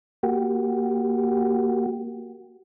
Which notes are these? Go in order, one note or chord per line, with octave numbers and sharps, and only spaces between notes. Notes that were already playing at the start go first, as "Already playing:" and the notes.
A#3 F#4 G4